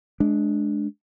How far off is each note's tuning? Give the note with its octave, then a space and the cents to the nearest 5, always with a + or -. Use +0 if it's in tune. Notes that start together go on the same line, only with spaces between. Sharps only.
G#3 +25 D4 +0